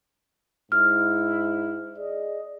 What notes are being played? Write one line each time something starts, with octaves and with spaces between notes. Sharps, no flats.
G#2 E4 F6
G#4 D5 D#5